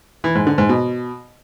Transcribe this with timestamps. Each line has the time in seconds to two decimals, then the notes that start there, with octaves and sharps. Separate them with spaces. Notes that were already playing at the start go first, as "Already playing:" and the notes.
0.24 E3
0.35 G#2
0.47 D3
0.58 G#2
0.69 B2